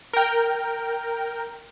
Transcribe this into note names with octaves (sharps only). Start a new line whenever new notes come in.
A#4 G5